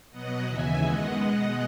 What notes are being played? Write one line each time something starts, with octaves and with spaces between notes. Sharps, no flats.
B2 F#3 B3 D#5 F#5
D#2 C#3 E3 E5 G#5
F#2 D#3 G#3 B3 D#5 F#5
B2 G#3 B3